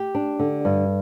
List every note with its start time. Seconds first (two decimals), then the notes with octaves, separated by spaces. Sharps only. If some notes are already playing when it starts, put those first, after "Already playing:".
Already playing: G4
0.15 D4
0.39 D3
0.65 G2